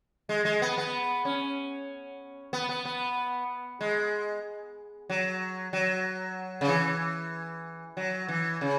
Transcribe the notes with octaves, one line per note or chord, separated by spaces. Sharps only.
G#3
G#3
B3
B3
C#4
B3
B3
B3
G#3
F#3
F#3
C#3
E3
F#3
E3
C#3